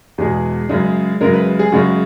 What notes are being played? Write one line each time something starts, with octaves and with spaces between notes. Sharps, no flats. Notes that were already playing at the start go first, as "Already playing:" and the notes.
E2 B2 G#3 G#4
F#2 C#3 G#3
F#2 C#3 G#3 A#4
B4
G#4
F#2 C#3 G#3 F#4